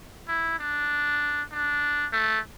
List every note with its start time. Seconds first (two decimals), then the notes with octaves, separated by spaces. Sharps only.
0.28 E4
0.59 D4
1.51 D4
2.12 A3